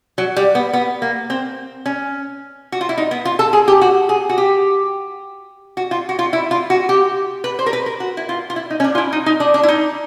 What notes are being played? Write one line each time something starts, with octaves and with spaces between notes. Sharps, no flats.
F#3
G3
B3
B3
A#3
C4
C#4
F#4
F4
E4
D#4
B3
F4
A4
G#4
G4
F#4
G#4
F#4
G4
F#4
F4
F#4
F4
E4
F4
F#4
G4
B4
C5
A#4
B4
A#4
F#4
E4
F4
F4
E4
D#4
C#4
D4
F4
E4
D#4
D#4
D4
D4
E4
D#4